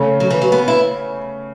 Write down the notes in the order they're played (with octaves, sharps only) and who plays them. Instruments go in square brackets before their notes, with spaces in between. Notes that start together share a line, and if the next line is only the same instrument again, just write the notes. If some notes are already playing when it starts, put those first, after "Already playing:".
Already playing: [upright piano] C#3 A3 C#4
[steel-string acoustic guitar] F#3
E3
F#3
B3
E4